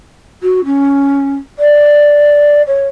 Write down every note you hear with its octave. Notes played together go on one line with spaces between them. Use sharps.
F#4
C#4
D5
C#5